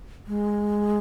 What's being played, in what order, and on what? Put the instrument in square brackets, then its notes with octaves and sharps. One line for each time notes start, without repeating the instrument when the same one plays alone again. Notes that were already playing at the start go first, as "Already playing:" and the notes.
[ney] G#3